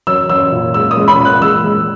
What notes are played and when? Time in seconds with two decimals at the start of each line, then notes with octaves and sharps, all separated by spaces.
0.07 F#3 E6
0.29 F#3 E6
0.52 A#2
0.74 G#3 E6
0.91 D#6
0.97 G#3
1.08 B5
1.19 A#2
1.25 F#6
1.41 G#3 E6
1.64 G#3